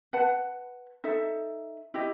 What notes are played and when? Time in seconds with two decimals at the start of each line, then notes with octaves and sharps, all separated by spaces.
0.13 B4 F#5 A5
1.04 D#4 A4 E5
1.94 E4 G4 D#5